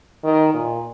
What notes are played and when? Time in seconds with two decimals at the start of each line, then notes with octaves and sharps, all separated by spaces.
0.24 D#3
0.54 A#2